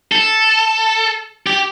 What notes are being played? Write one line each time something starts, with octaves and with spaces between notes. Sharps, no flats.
A4
G4